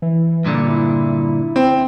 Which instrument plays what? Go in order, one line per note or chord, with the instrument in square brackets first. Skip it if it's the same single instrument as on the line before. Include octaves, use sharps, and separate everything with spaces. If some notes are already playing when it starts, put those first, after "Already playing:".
[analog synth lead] E3
[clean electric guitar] G2 A#2 D3
[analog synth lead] E4
[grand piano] C4